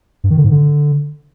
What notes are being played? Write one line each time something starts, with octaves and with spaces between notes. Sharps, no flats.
G2
D#3
D3
G#2
D3